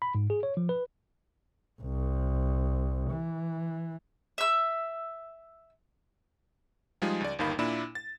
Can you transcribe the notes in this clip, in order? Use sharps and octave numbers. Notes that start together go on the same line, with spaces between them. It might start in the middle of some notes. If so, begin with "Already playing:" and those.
B5
G#2
G#4
C#5
F3
B4
C2
E3
E5 E6
F3 G3 G#3 D#4 F4 G#4
C#2 D5
G1 D#2 D#3 F5 B5
A#2 A#3 D4 E4 B5 E7
A6